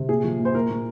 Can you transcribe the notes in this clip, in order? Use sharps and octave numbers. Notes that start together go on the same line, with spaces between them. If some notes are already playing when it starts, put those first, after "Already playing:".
Already playing: C3
A#2 G#4
F3
A#2
C5
A#2 A#4
A#2